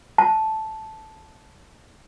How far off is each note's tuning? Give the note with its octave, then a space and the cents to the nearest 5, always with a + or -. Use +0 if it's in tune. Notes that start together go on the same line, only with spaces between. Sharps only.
A5 -5